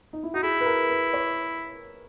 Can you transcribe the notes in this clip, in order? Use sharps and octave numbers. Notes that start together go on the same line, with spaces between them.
D#4
E4
D#4 F#4
E4 G#4
B4
A#4
B4
C#5